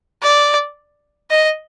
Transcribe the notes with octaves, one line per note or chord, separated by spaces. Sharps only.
D5
D#5